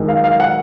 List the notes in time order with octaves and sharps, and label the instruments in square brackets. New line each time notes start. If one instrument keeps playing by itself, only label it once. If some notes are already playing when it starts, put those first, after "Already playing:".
Already playing: [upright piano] F#2 D#3 G#3
F5
F5
F#5